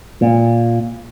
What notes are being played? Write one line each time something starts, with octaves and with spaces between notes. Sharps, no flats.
A#2